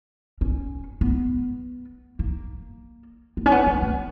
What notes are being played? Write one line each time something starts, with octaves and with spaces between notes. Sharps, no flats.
C#4
B3
A#3
B3
C#4
B3
G#3
B3